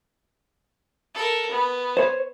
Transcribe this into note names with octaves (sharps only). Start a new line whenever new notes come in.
A4 A#4
B3
C5 C#5